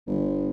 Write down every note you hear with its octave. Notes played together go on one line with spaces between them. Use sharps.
G1